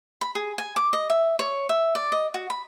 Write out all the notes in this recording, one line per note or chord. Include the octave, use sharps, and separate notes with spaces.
B5
G#4
G#5
D6
D#5
E5
C#5
E5
D5
D#5
F#4
B5